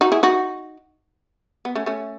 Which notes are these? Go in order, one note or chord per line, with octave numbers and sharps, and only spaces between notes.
D#4 F#4
E4 G#4
D#4 F#4
B3
A3 C#4
A3 C#4